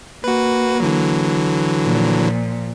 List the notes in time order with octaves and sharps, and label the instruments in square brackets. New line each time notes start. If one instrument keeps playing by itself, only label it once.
[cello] A#3 [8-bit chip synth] F#4 B4
[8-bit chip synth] D3 E3 F#3
[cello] A#2 F3